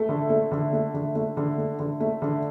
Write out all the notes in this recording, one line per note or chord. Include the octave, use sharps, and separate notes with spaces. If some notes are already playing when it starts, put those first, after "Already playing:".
Already playing: A3 A4
D3
A3
D3
A3
D3
A3
D3
A3
D3
A3
D3